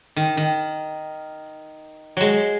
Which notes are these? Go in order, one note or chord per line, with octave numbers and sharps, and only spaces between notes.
D#3
D#3
F#3 G#3